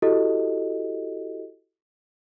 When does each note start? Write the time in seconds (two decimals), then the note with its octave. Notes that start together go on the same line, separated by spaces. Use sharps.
0.02 E4 F#4 G4 A4 D#5